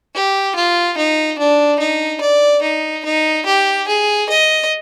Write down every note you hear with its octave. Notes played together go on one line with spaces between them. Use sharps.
G4
F4
D#4
D4
D#4
D5
D#4
D#4
G4
G#4
D#5